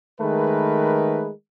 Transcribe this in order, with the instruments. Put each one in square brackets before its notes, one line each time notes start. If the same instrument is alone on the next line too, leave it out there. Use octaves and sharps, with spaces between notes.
[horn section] D#3 G#3 A3 A#4 B4